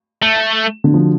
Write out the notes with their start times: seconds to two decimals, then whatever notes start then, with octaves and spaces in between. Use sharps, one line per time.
0.22 A3
0.84 D3
0.94 F3